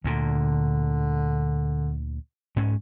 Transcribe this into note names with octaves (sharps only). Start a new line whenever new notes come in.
D2 A#2 D3
G#2 C#4